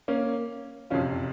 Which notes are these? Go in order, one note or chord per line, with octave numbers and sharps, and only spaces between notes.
A#3 C#4
F#1 F2 C3 C#4 F4